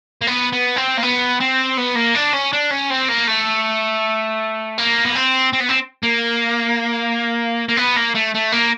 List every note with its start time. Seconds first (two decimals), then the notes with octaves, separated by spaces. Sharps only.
0.21 A#3
0.27 B3
0.53 B3
0.77 C4
0.98 A#3
1.03 B3
1.40 C4
1.77 B3
1.96 A#3
2.15 D4
2.34 C#4
2.53 D4
2.71 C#4
2.90 C4
3.09 A#3
3.28 A3
4.78 A#3
5.05 B3
5.15 C4
5.53 C4
5.60 B3
5.69 C4
6.03 A#3
7.69 A#3
7.77 B3
7.97 A#3
8.15 A3
8.34 A3
8.52 A#3